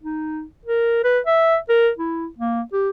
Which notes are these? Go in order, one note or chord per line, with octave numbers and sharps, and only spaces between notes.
D#4
A#4
B4
E5
A#4
E4
A#3
G4